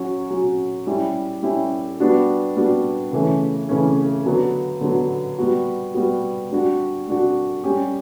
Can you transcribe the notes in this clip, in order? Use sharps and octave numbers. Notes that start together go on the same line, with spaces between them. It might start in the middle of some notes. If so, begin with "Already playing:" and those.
Already playing: F#3 C#4 F#4
F#3 C#4 F#4
G3 C#4 E4 G4
G3 C#4 E4 G4
G3 B3 D4 F#4
G3 B3 D4 F#4
C#3 E3 A3 C#4
C#3 E3 A3 C#4
D3 F#3 B3
D3 F#3 B3
G3 B3 F#4
G3 B3 F#4
G3 D4 F#4
G3 D4 F#4
G3 C#4 G4